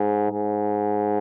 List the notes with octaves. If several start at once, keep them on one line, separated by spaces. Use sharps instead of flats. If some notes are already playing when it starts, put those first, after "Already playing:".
Already playing: G#2
G#2